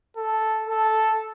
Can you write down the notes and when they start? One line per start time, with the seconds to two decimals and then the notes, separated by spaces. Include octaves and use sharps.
0.17 A4
0.67 A4